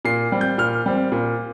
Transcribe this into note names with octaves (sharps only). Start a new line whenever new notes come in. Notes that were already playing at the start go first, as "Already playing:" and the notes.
A#2 C7
G3 C4
G6
A#2 F6
G3 C4
A#2